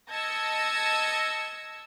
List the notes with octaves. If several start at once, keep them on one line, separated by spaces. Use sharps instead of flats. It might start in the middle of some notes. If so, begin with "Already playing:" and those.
D#5 A5 E6 G#6 A#6 C#7